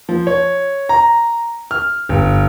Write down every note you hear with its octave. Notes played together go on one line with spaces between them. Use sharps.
F3
C#5
A#5
F6
G1